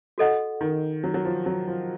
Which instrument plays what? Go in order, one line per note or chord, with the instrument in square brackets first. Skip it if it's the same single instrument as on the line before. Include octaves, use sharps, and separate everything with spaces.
[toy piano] F#4 A4 D#5 F#5
[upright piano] D#3
F#3
F#3
F3
F#3
F3